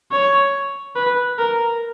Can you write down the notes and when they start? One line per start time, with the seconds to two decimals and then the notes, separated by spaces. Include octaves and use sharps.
0.12 C#5
0.96 B4
1.38 A#4